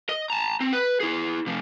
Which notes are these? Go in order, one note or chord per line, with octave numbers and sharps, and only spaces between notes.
D#5
A5 A#5
C4
B4
E4 G#4
C3 F3